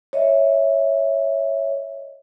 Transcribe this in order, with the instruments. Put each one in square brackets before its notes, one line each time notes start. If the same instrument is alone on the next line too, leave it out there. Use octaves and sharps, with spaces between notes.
[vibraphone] C#5 D#5 E5